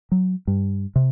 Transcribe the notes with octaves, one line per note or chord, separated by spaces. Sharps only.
F#3
G2
C3